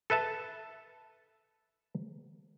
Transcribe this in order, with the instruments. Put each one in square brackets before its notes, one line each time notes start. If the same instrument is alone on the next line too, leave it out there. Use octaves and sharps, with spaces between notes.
[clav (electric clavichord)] A4 B4 E5 A5